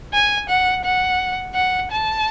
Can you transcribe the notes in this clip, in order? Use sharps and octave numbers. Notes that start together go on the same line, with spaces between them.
G#5
F#5
F#5
F#5
A5